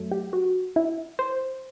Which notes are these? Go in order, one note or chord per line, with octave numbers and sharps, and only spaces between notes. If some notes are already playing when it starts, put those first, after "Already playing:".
Already playing: F#2 F#3 A3
G4
F#4
E4
C5